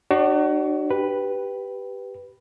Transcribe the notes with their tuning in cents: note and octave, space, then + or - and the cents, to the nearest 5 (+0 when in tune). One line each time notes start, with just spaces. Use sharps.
D4 +40 F#4 +30 C#5 +0
G4 +0 B4 +0